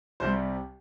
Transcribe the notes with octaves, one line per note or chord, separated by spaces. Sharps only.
C2 C3 G3 C5